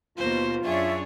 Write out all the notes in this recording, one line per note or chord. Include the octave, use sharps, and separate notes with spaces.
D#2 B2 A#3 F4 C5
F#2 D4 G#4 C#5 E5